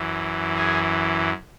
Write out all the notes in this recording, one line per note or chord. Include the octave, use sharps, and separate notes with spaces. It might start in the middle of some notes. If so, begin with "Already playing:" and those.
Already playing: F#2 E3
G#4